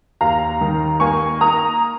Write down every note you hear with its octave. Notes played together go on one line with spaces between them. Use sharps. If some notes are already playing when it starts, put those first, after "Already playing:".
D#2 F5 A#5
D#3
A#3 G#5 C#6
A#3 A#5 D#6